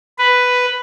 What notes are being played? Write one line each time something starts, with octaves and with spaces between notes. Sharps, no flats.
B4